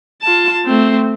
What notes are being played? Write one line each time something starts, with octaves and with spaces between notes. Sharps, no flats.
F4 A5
A3 C4